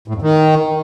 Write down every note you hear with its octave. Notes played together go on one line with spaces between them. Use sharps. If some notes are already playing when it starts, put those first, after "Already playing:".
A2
F2
D#3